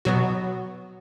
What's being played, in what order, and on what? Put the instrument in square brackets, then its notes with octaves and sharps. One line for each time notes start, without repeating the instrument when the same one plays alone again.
[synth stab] B2 F#3 B3 F#4